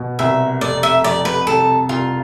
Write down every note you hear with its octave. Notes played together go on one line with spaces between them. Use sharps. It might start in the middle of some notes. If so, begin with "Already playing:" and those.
Already playing: B2
C2 E5
F1 D5
E5
F2 D5
B4
C2 A4
C2 F4